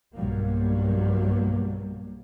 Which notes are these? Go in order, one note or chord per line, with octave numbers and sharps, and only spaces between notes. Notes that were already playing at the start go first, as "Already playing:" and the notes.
B1 G2 F#3 G3 A#3